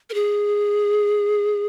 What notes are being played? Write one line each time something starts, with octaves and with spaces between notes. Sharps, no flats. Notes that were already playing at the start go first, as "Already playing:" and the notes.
A#4
G#4